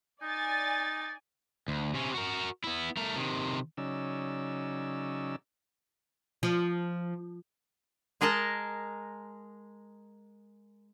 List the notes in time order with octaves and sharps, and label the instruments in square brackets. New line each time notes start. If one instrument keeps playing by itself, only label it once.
[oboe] D#4 [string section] D5 G#5 A6
[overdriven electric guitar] D2
C3 C#4
F#4 A#4
B3 E4
A3 A#4
C3 D#3
[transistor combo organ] C#3 F#3 C#4 D#4 D5 E6
[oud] F3
[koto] G#3 G#4 A#4 D#5 A5